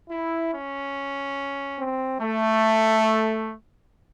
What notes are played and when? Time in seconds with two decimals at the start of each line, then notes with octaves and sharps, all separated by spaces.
0.10 E4
0.52 C#4
1.78 C4
2.21 A3